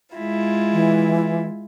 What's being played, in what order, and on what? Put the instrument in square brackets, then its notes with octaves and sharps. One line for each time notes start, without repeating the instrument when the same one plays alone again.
[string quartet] G#3 E4 F4
[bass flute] E3